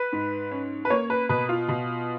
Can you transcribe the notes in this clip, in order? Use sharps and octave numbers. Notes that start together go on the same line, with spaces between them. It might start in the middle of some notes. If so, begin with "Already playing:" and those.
Already playing: B4
G#2
C#4
B4
A#3 C#5
B4
B2 B4
F4
B2